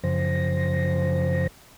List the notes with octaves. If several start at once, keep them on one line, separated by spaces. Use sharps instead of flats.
F#2 C#3 F3 C5 A#6